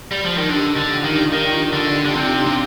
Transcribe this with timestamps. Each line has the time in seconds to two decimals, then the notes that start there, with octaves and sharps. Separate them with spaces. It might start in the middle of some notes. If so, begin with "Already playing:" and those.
0.11 G3
0.24 F3
0.38 D#3
0.49 D3 D#4 G4
0.77 D3
0.90 D4 F4
1.05 D#3
1.32 D#3
1.72 D3
2.05 D3
2.14 C3
2.46 C3